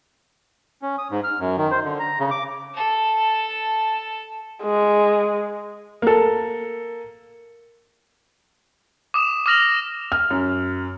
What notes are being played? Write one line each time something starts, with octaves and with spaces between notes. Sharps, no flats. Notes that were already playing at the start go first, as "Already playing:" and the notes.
C#4
D#6
G#2
F6
F#2
D#3
C5
D3
A#5
C#3
D6
A4 A5
G#3
A#3 A4
D6 D#6 E7
D6 D#6 F6 A#6 F7 F#7
F6
F#2